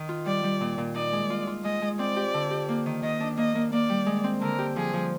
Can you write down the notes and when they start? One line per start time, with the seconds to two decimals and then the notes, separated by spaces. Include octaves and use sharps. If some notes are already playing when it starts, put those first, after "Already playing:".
Already playing: D#3
0.09 F4
0.26 G3 D5
0.44 G3
0.61 A#2
0.78 A#2
0.95 D#4 D5
1.13 G#3
1.30 F4
1.47 F4
1.64 G#3 D#5
1.82 G#3
1.99 C4 D5
2.16 G4
2.34 D3
2.51 G4
2.69 A#3
2.86 D#3
3.03 D#3 D#5
3.20 D4
3.37 A#3 D#5
3.55 A#3
3.72 A#3 D5
3.90 G3
4.06 G#3
4.24 C4
4.41 D3 A#4
4.59 G4
4.76 F3 G#4
4.93 F3